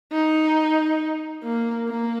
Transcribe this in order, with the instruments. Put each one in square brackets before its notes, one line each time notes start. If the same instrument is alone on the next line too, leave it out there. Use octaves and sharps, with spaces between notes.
[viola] D#4
A#3
A#3